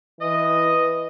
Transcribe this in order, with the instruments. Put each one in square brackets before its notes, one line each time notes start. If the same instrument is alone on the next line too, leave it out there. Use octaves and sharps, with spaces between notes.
[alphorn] E3 [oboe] D#5